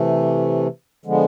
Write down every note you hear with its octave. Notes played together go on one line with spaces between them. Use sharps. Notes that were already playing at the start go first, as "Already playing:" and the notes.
Already playing: C3 E3 A3
D3 F3 G#3 B3